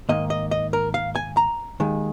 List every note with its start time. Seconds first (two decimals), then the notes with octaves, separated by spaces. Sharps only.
0.09 G#2 D#3 A#3 D#5
0.30 D#5
0.51 D#5
0.73 A#4
0.94 F5
1.16 G#5
1.37 A#5
1.80 D#2 D#3 G#3